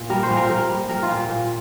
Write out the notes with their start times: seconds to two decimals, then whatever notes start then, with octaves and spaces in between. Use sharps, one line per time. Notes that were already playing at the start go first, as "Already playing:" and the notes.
Already playing: A#2
0.10 G3 A#4
0.23 C5
0.30 A#2
0.37 A#4
0.50 A#2 A#4
0.69 G3
0.89 G3 A#4
1.03 F4
1.09 A#2
1.29 A#2